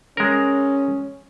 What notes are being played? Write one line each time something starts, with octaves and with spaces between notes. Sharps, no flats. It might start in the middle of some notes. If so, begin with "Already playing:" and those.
G#3 C#4 A#4